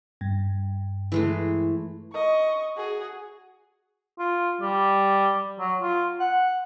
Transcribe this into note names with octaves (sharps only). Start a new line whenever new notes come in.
G2
E3 G#3 A3
D#5 C#6
F#4 G#4
F4
G3
F#3
F4
F#5